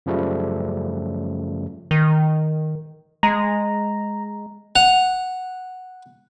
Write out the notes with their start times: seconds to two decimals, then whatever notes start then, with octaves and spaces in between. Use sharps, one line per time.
0.06 F#2 C#3 F3 G3 A3
1.91 D#3
3.23 G#3 A#5
4.76 F#5 F7